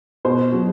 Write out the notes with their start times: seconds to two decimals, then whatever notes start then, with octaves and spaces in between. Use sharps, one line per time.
0.25 B2 C5
0.53 F#3